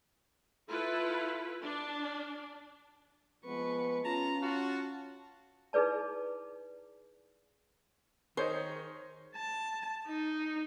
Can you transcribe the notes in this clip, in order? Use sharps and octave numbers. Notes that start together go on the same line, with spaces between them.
E4 F4 A4 B4
D4
F3 G#3 B3 B4 C#6
C#4 F4 A5 A#5
F4 F#4 A5
D#4 E4 G#4 B4 D5 A5
D#3 G#4 C5 C#5 D#5
A5
D#4